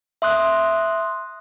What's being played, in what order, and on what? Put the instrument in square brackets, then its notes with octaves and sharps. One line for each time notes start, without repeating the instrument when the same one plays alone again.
[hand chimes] E5 C6 D#6 F#6